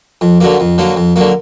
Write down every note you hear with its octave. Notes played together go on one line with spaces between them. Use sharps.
F2
D3 F#3 A#3
F2
D3 F#3 A#3
F2
D3 F#3 A#3